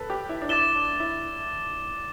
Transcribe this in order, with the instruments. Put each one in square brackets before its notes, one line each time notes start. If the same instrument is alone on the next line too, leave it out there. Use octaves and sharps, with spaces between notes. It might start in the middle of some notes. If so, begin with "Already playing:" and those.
Already playing: [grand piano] A4 B4
G4
E4
D4
[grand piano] E4 [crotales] D6 A6 E7 G7
[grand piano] D4
E4